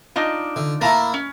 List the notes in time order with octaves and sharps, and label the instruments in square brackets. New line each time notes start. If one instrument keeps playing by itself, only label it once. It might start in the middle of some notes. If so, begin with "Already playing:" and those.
[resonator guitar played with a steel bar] D4 D#4 F4
[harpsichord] D3
[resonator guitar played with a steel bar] A2 A5 A#5 [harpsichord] A#3 E4
[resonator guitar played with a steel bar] C#4